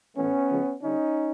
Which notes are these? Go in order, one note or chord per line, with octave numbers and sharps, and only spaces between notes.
A2 E3 A3 B3 C#4
C#3 F3 G#3
D3 G3 C#4 D#4